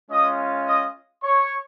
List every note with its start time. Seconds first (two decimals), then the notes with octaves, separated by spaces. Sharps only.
0.11 G#3 C#4 F4 D#5 D#6
0.68 D#5 D#6
1.23 C#5 C#6